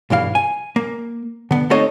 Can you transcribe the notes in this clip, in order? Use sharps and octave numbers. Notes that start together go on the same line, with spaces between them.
B1 G2 E3 F5
G#5
A#3
D3 B3
A3 C4 D#4 A4 C#5 D#5